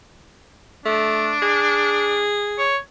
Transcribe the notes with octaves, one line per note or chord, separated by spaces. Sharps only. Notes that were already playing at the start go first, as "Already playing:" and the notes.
A3 D4
G#4
C#5